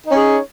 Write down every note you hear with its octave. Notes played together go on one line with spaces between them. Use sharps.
C#4 D#4 G#4 C#5